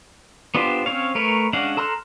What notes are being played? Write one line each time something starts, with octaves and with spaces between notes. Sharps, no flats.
B3 D4 F4 G4 C5
C4 C#4 C#5 F5
A3 A#4 B4 C#5
G#3 C#4 D4 F5 F#5
A4 A#5 C6 F6 F#6